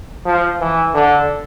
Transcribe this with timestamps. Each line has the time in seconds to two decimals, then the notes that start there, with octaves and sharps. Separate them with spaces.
0.25 F3
0.60 E3
0.94 D3